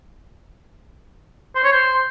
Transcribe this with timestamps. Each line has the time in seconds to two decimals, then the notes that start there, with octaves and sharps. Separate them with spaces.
1.55 C5
1.64 C#5
1.72 C5